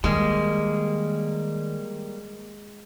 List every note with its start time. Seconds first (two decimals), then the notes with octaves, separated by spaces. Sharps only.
0.04 D#3 G3 G#3 A#3